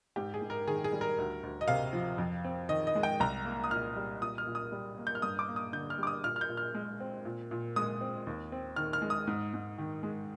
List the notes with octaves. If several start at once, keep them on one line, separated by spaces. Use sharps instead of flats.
G#2 G4
G#4
G#2
A#4
D#3 G#4
G#4
G3
A#4
D2
D2
D#5
C3 F5
F3
F2
C4
D#3 D#5
D#5
G#3
G5
C2 A#5
A#3
D#6
A#2 F6
G3
A#2 D#6
F6
A#2
D#6
G3
A#3
G6
F6
G2 D#6
D6
A#3
D#6
D3 G6
F6
G3 D6
D#6
A#2 F6
F6
G6
A#2
F6
G#3
C4
A#2
A#2
G#3 D#6
C4
D#2
C4
D#3 F6
F6
G#3
D#6
G#2
G#2
D#3
G#3